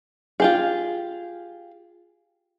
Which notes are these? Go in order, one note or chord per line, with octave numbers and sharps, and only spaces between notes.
F4 G4 G#4